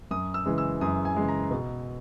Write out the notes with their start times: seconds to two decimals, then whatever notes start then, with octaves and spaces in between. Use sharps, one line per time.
0.11 F#2 D#6
0.34 E6
0.46 C#3 E3 G#3
0.58 E6
0.81 F#2 D#6
1.05 G#5
1.16 C#3 E3 G#3
1.28 A#5
1.51 B2